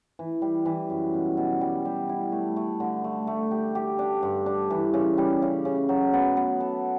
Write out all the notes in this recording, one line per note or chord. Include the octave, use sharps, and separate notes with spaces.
E3
G3
E3
F#2
B2
B2
G3
G3
E4
A3
A3
D3
A3
A3
G4
G4
D4
G2
D4
E3
C#3
G3
C#3
C#3
F#3
B3
B3
A4